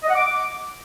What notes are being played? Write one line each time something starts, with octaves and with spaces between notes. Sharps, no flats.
D#5
F#5
D6